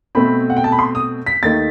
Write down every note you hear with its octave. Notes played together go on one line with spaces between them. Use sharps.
B2 A3 C4 B5
F#5
G5
A5
B5
C6
D#6
B6
D#2 D#3 A3 D#4 A6